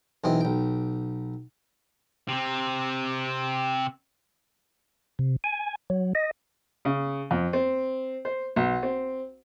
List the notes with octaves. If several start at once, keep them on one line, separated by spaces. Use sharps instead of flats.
B1 E3 C4 D#5
B1 G5
C3 C4
C3
G#5
F#3
D#5
C#3
F2
C4
C5
B1
C4